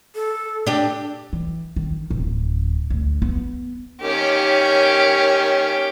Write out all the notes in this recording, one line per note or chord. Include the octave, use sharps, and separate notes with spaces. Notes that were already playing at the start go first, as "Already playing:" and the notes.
A4
D4 G4
E3
D#3
D1
D2
B3
D#3 A#3 C#4 G4 C#5